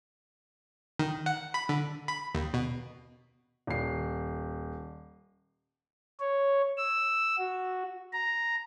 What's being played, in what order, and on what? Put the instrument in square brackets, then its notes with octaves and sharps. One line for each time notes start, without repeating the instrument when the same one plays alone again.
[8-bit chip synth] D#3
F#5
B5
D3
B5
D#2
B2
[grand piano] D#1 C7
[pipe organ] C#5
E6
F#4
A#5